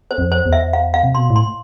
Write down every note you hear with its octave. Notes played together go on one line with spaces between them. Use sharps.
C5
F2
C5
E2
E5
F5
F5
C3
B2 C6
A2
C6